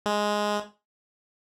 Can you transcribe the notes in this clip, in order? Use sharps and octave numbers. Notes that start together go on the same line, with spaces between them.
G#3